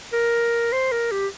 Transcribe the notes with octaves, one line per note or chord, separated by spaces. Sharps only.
A#4
C5
A#4
G4